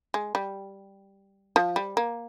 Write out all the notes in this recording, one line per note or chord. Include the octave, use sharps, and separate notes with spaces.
G#3
G3
F3
G3
A#3